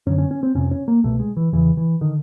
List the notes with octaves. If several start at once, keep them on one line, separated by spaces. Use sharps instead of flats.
F#2 D3 C#4
C#4
C#4
C4
F2 C3 C#4
C#4
A#3
C2 B2 A3
G#3
E3
E2 C#3 E3
E3
D3 D#3